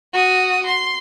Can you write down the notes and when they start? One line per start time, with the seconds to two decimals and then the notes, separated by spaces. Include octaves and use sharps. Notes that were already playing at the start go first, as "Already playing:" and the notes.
0.13 F#4 D#6
0.66 C6